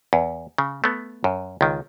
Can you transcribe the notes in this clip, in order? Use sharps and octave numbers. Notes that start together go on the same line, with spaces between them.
E2
C#3
A3 B3
F#2
C#2 D#3